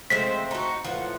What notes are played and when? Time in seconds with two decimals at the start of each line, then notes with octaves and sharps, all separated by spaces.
0.10 F3 G#3 A3 C4 C5 B6
0.51 D#4 F#4
0.85 A2 E3 F3 F#5